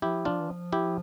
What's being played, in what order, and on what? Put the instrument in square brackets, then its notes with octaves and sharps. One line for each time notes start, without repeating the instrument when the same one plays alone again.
[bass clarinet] F3 [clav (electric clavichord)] E4 G4
[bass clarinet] F3 [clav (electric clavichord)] D4 F4
[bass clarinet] E3
F3
[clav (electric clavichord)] E4 G4